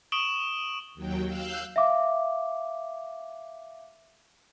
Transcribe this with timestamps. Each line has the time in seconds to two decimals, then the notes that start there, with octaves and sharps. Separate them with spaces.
0.12 C#6 D#6 D7 E7 F#7 G7
0.94 D#2 F#3 G5
1.26 F5 E6 F#6 G6
1.76 E5 F5 D6